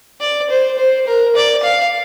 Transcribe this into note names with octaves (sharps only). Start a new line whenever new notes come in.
D5
C5
C5
A#4
D5
F5